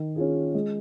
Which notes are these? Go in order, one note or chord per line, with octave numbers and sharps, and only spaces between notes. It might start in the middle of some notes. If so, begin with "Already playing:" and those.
Already playing: D#3
C#4 F4 G#4
G#3